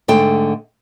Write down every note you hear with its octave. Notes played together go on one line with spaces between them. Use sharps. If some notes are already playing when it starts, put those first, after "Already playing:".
G#2 D3 A3 G5